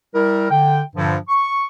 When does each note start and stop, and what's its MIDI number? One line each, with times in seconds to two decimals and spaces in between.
0.15 0.47 55
0.15 0.47 64
0.15 0.47 70
0.51 0.81 50
0.51 0.81 79
0.96 1.17 43
0.96 1.17 46
0.96 1.17 50
0.96 1.17 53
1.29 1.66 85